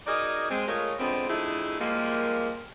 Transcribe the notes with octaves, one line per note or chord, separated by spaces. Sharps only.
D#4 F#4 G#4 A#4 D5 D#5
G#3 C4
G#3 A3 F4 G#4 A#4 C#5
F2 D3 G#3 B3 C4
F2 D3 A3 D#4 E4 G#4
F3 G3 G#3 A#3